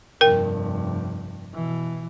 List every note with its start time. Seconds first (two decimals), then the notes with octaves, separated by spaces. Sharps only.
0.21 F1 G2 A#4 G5
1.54 B2 E3